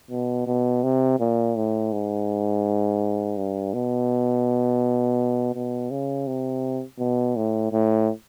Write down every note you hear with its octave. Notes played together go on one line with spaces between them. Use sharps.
B2
B2
C3
A#2
A2
G#2
G2
B2
B2
C#3
C3
B2
A2
A2